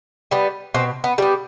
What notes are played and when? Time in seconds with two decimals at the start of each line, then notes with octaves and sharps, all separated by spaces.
0.31 G3 B3
0.74 B2 C4
1.04 B3
1.18 G3 B3